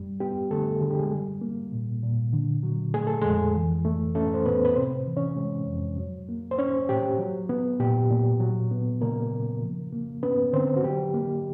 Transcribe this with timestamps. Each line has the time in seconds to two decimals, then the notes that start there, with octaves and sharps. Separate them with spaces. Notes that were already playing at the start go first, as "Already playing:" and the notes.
Already playing: F#2 G3
0.20 B3 G4
0.51 D3 A3 A4
0.81 D3 G#4
0.90 G4
0.99 G#3 G#4
1.12 G3
1.41 A#3
1.72 A#2
2.03 A#2
2.33 D3
2.63 F#3
2.94 A3 G#4
3.07 A4
3.22 F2 G#3 G#4
3.55 E3
3.85 A3
4.15 A3 C#4 A4
4.34 C5
4.46 A2 B3 B4
4.65 B4
4.76 C3 C4 C5
5.07 E3
5.17 C#4 C#5
5.37 G#3
5.67 F2
5.98 F#3
6.29 A#3
6.51 C5
6.58 C#4 C#5
6.89 A2 G4
7.19 F#3
7.49 B3
7.80 A#2 G4
8.10 A#2
8.40 F#3
8.71 B3
9.01 C#3 A#3 A#4
9.32 C#3
9.62 F3
9.92 A#3
10.23 B3 C#4 B4
10.53 D3 C4 C5
10.77 F#4
10.84 F#3 G4
11.14 A#3